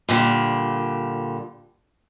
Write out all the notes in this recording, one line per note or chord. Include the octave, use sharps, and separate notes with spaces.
A#2 D3 G3